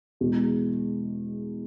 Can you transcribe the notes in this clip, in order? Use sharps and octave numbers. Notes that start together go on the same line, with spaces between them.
E2 B2 G#3